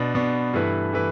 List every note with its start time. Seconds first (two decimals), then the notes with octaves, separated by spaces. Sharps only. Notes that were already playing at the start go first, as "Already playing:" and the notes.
Already playing: B2 B3 D4
0.15 B2 B3 D4
0.54 G2 E3 A3 E4 B4
0.93 E3 A3 E4 B4